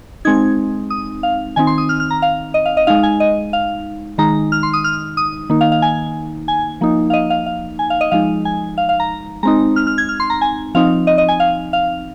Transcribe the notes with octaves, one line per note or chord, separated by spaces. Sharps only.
G#3 C4 D#4 G#6
D#6
F5
D#3 C4 D#4 G#5
C6
D#6
F6
F6
A#5
F5
D#5
F5
D#5
G#3 D#4 F5
G#5
D#5
F5
D#3 G#3 D#4 A#5
F6
C6
D#6
F6
D#6
D#3 A#3 D#4
F5
F5
G#5
G#5
F3 A#3 D#4
F5
D#5
F5
F5
G#5
F5
D#5
F3 G#3 D#4 F5
G#5
F5
F5
A#5
G#3 C4 D#4 A#5
F6
F6
G#6
F6
C6
A#5
G#5
F3 C4 D#4 F5
D#5
D#5
G#5
F5
F5